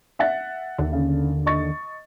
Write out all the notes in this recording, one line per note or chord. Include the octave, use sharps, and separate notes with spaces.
E5 F#5 A6
D#2 D3
C#3
D#5 C#6 A6